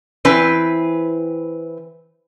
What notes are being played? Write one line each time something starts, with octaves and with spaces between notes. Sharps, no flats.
E3 C4 B4